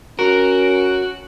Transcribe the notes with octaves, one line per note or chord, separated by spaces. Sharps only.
C#4 F#4 A#4